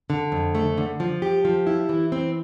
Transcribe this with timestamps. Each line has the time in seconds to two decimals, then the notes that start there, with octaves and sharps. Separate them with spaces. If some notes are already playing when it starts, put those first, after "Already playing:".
0.10 D3
0.32 F2
0.55 A3
0.78 D3
1.00 F3
1.22 G4
1.45 F3
1.67 E4
1.89 E3
2.12 C4